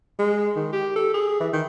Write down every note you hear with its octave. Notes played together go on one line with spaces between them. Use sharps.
G#3
D#3
G4
A4
G#4
E3
D#3